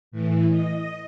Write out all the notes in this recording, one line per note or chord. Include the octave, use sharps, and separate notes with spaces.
A2 E3
D#5